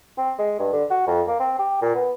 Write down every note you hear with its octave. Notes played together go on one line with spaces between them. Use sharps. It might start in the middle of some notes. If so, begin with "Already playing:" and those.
C4
G#3
G2
D3
F#4
F2
A#3
C4
G4
A#2
B3